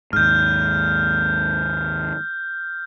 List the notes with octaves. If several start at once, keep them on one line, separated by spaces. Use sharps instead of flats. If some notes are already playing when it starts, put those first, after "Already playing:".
D#2 G#2 F6 G6